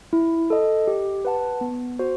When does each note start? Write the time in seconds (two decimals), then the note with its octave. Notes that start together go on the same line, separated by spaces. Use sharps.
0.13 E4
0.50 A4 D#5
0.87 G4
1.25 B4 F#5 A5
1.61 B3
1.99 F#4 C5